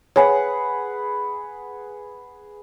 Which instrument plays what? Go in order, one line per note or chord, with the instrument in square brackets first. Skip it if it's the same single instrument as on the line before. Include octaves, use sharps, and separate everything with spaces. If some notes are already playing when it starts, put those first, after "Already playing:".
[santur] G#4 B4 F#5 [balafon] C#5 G#5